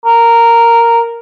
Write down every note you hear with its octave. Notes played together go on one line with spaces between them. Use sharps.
A#4